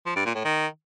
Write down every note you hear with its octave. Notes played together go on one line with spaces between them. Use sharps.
F3
G2
A#2
A2
D#3